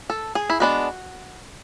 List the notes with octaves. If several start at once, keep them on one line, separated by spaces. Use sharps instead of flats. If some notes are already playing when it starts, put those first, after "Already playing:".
A4
G#4
E4
G#3 B3 D4 F#4